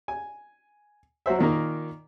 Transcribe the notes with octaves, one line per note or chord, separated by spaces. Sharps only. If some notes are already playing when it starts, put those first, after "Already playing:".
G#5
F#3 F#4 C5 E5
A#2 D#3 A#3